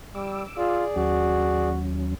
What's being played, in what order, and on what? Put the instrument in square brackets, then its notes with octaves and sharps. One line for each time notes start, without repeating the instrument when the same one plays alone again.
[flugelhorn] G3 [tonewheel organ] D6 E6
[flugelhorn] F4 [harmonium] G#4 D5
[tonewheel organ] D#2 F#3 C#4 [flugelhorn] F#4